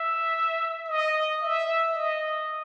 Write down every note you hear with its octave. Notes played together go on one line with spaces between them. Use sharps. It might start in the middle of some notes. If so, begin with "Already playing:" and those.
Already playing: E5
D#5
E5
D#5